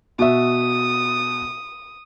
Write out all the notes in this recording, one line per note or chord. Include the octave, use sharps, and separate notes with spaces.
B2 F#4 E5 D#6